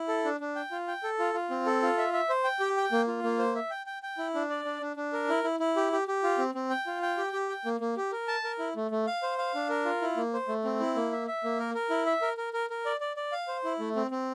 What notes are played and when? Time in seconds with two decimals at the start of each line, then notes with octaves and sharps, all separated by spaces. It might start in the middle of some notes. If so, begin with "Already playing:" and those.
Already playing: E4
0.08 A4
0.25 D4
0.40 D4
0.56 G5
0.71 F4
0.88 G5
1.03 A4
1.19 F4
1.34 F4
1.50 C4
1.66 A4
1.82 F4
1.98 E5
2.13 E5
2.29 C5
2.44 G5
2.60 G4
2.77 G5
2.92 A#3
3.07 F4
3.24 A#3
3.39 C5
3.55 E5
3.70 G5
3.86 G5
4.03 G5
4.18 E4
4.34 D4
4.50 D5
4.65 D4
4.81 D4
4.96 D4
5.13 A#4
5.29 E4
5.44 E4
5.60 E4
5.76 G4
5.92 G4
6.08 G4
6.23 F4
6.38 C4
6.55 C4
6.70 G5
6.87 F4
7.02 G5
7.18 G4
7.33 G4
7.49 G5
7.65 A#3
7.80 A#3
7.97 G4
8.12 A#4
8.28 A5
8.44 A#4
8.59 E4
8.76 A3
8.91 A3
9.07 F5
9.23 C5
9.38 F5
9.55 D4
9.69 A#4
9.85 F4
10.02 E4
10.17 A#3
10.34 C5
10.48 A3
10.65 C4
10.80 E4
10.95 A#3
11.12 E5
11.27 E5
11.44 A#3
11.59 A#4
11.75 A#4
11.90 E4
12.06 E5
12.22 A#4
12.37 A#4
12.53 A#4
12.70 A#4
12.85 D5
13.01 D5
13.17 D5
13.32 F5
13.48 C5
13.64 E4
13.79 A3
13.96 C4
14.11 C4